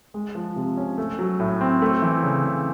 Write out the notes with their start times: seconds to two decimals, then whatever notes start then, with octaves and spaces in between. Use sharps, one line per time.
0.14 G#3
0.35 F3
0.56 C3
0.77 C#4
0.98 A3
1.19 F#3
1.40 A2
1.61 C4
1.82 A3
2.02 E3
2.23 C#3
2.44 C#3